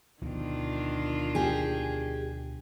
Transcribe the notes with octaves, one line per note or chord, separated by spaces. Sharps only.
D2 B2 D#3 F3 D4 F4
G4 G#4